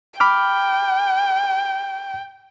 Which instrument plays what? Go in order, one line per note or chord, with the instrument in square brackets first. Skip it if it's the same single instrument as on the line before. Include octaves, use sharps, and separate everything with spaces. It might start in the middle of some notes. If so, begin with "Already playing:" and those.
[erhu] G5 [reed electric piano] B5 D6 F6